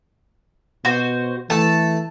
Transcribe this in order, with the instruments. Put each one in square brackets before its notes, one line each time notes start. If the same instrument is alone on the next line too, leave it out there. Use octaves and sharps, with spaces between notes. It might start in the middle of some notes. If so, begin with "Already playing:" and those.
[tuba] B2 [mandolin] F#4 C5
[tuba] E3 [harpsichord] A3 [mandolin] A5